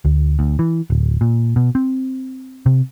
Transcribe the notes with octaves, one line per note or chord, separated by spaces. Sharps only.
D2
D2
E3
D1
A#2
B2
C4
C3